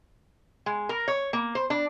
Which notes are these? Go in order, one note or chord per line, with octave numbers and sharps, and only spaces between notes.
G#3
A#4
C#5
A#3
C5
D4